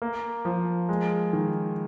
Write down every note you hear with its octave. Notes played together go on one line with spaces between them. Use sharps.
A#3
F3
G#3
D#3